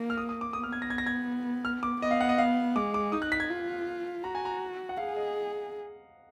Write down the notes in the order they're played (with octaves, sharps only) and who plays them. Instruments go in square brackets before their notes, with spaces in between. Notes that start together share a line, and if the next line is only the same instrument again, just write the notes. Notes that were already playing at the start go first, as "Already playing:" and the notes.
Already playing: [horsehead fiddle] A#3
[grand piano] F6
D#6
D#6
D6
[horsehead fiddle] B3 [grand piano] D#6
[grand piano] F6
G#6
A#6
G#6
A#6
G#6
F6
D6
[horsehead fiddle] B3 [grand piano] D#5
[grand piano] F5
F#5
D#5
F5
[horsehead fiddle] G#3 [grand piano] D6
[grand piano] D6
[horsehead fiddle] D#4 [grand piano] D#6
[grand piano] F#6
B6
G#6
[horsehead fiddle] F4
[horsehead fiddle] F#4 [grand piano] A#5
[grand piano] G#5
A#5
F#5
[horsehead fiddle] G#4 [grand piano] F5
[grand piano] D#5